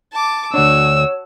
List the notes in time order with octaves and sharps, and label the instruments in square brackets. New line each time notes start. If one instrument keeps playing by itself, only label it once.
[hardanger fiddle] A5 D6
[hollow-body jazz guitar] D2 D4 [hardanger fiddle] F#4 [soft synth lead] C#5 [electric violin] E6